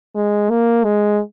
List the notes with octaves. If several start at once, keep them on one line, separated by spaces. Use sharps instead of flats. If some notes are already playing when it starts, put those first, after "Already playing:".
G#3
A#3
G#3